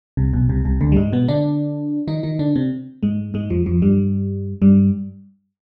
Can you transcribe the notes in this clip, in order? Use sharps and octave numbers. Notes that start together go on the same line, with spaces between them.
C2 C3
B1 B2
C2 C3
C2 C3
D2 D3
G3
G#2 G#3
B2 B3
D3 D4
D#3 D#4
D#3 D#4
D3 D4
C3 C4
G#2 G#3
G#2 G#3
F2 F3
F2 F3
G2 G3
G2 G3